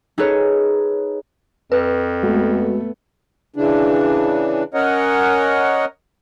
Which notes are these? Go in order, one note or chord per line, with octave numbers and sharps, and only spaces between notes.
D#4 G#4 A4 B4 C#5
F2 B4
G#3 A3 B3 F#4
C#3 E3 D4
C#4 A#4 C#5 D#5 F#5